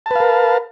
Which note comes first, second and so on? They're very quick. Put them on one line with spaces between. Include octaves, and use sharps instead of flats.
A5 B4 F5 A#4